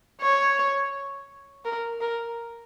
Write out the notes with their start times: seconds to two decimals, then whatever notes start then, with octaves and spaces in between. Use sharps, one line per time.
0.21 C#5
1.65 A#4
2.01 A#4